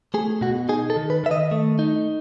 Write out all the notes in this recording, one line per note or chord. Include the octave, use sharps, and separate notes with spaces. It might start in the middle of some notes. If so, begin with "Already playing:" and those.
A3 G#4
B2 F#4
D#4 G#4
A4
D#3
B4
D#3 E5
D#5
A3
D#4